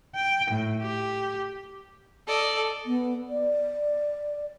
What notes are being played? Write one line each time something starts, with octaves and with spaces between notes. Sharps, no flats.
G5
A2
G4
A4 D5 D#5
B3
D5